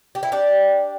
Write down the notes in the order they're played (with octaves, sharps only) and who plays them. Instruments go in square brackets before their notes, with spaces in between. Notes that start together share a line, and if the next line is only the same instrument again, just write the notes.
[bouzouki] G4
E4
D4 G4